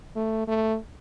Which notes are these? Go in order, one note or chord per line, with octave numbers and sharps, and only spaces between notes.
A3
A3